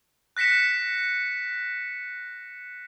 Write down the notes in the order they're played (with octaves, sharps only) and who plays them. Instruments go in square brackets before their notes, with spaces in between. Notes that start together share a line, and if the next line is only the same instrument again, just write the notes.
[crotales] F#6 A#6 B6 C#7 E7